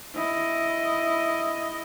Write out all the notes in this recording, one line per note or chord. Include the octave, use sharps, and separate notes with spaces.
E4 D#5